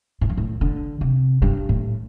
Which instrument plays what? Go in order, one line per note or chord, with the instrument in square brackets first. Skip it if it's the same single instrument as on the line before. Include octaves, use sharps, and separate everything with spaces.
[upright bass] A2
G2
A2
D3
C3
G2
A2